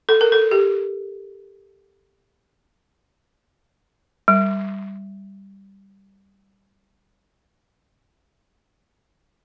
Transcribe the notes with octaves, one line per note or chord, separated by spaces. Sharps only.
A4
A#4
A4
G4
G3